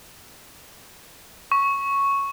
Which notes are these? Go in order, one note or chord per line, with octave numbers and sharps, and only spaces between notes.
C#6